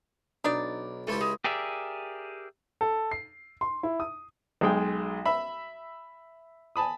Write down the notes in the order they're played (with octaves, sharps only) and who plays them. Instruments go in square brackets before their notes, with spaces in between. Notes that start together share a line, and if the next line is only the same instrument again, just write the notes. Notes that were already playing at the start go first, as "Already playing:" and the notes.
[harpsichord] B1 [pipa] D4 D#4 D5
[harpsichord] C#2 E4 G4 [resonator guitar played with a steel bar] A3 A4 C5
[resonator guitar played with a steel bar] G#3
[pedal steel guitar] G4 G#4 A#4 D5 E5
[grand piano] A4
C7
C6
E4
D#6
[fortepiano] B1 G#3 G5
E5 B5
G#5 A5 B5 D#6